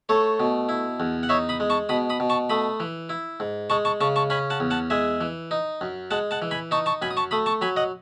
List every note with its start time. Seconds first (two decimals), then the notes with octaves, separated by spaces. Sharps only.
0.09 A3 A4 C#5
0.40 B2
0.69 E4
1.00 E2
1.23 F#5
1.29 D#4 C#5 E5
1.49 B5 D#6
1.60 G#3
1.70 A5 C#6
1.89 B2 B5 D#6
2.10 B5 D#6
2.20 B2
2.30 A5 C#6
2.50 A3 B5 D#6
2.80 E3
3.09 E4
3.40 G#2
3.70 G#3 A5 C#6
3.85 A5 C#6
4.01 C#3 A5 C#6
4.16 A5 C#6
4.30 C#4 G#5 B5
4.50 F#5 A5
4.60 E2
4.71 F#5 A5
4.90 G#3 E5 G#5
5.21 E3
5.51 D#4
5.81 F#2
6.11 G#3 F#5 A5
6.31 F#5 A5
6.42 E3
6.51 G#5 B5
6.71 D#4 A5 C#6
6.86 A5 C#6
7.02 F#2 G#5 B5
7.11 D#6
7.17 A5 C#6
7.31 A3 B5 D#6
7.46 A5 C#6
7.61 F#3 G#5 B5
7.76 D#5 F#5